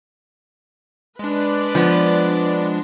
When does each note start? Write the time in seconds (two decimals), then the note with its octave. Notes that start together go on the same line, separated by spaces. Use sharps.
1.19 G#3 D4 B4 D5
1.75 F3 B3